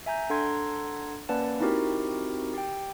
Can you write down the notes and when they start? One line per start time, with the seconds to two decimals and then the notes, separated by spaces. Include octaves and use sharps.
0.06 E5 G#5 A#5 G6
0.30 D4 A4 F#5 A#5 C6 G#6
1.29 A#3 C#4 B4 D5 F#5 A5
1.60 C4 D#4 E4 F#4 G4 A#4
2.54 G4 G5